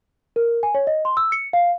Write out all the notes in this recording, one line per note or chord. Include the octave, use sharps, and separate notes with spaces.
A#4
G#5
C#5
D#5
C6
E6
C#7
F5